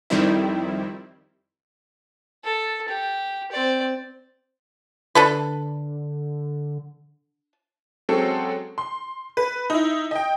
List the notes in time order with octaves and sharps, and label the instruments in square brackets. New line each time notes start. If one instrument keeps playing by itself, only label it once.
[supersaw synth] F2 D#3 G3 C4 E4
[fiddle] A4
G4
C4 D5
[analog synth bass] D3 [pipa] D4 A4 B4
[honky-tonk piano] F#3 G#3 C4 C#4 A4
C6
B4
D#4 E4
D#5 G5